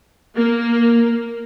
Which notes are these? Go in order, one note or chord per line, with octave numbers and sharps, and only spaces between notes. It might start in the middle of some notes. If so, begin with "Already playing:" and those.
A#3